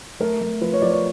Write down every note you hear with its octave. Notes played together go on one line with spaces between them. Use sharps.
A3 A#4
A3
F3 B4
C#5
F3 D5
C#5